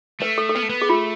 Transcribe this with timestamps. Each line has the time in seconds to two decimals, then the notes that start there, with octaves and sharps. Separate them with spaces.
0.21 A3 B4
0.38 A4
0.49 A4
0.55 B3 B4
0.63 A3
0.69 B3
0.82 G#4
0.89 A3 F4